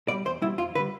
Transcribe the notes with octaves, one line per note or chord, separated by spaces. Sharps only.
B2 G3 D5
E2 C5
B2 G3 E4
F2 F4
D3 G3 B4